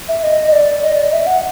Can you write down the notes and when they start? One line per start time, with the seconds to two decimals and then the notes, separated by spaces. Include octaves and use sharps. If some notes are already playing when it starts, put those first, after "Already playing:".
0.08 E5
0.23 D#5
0.48 D#5
0.52 D5
0.82 D#5
0.94 D5
1.02 D#5
1.12 E5
1.27 F#5